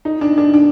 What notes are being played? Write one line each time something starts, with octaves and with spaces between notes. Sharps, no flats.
D#4
D4
D4
D4